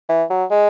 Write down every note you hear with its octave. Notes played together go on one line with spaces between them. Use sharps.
E3
F#3
G#3